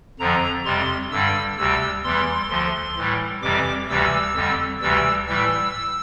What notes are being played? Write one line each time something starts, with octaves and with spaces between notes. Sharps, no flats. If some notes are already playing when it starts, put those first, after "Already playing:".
F2 D3 F3 A#5
F2 C3 G3 C6
G2 D3 G3 E6
D2 C3 G3 E6
E2 E3 G3 C6
D2 D3 F3
A2 E3 G3
F2 C3 E3 G3 D6
D2 C3 E3 G3 E6
F2 D3 G3
D2 C3 E3 G3 E6
A2 E3 G3 E6